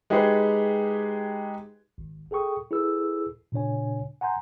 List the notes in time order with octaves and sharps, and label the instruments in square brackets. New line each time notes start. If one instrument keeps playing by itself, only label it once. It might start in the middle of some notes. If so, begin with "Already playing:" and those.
[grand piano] G#3 D#4 G4 G#4 B4 C5
[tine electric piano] G#1
G#4 A4 G5 C#6 D#6
E4 G#4 A4 B4 E6
A#2 C#3 D4 C#5 G#5
F#5 G#5 A#5 C6 G6